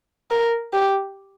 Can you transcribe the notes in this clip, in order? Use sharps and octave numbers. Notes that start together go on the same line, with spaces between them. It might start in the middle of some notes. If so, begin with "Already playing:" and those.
A#4
G4